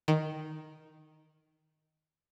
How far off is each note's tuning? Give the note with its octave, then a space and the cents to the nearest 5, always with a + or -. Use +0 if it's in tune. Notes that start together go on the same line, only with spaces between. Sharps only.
D#3 +0